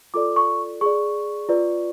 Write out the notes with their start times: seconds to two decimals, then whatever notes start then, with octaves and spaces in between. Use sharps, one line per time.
0.14 F4 A4 D5 D6
0.36 C#6
0.81 G#4 D5 C#6
1.49 F4 B4 D5